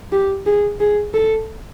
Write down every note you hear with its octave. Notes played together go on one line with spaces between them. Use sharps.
G4
G#4
G#4
A4